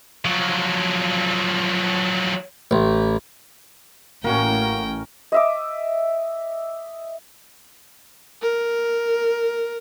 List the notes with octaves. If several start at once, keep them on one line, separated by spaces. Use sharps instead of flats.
F3 F#3
A1
A1 A2 A#3 C#4 F#4 A#4 G5
D#5 E5 D6
A#4